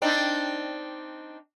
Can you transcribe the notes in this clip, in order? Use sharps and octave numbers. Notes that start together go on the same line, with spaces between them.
C4 D4 D#4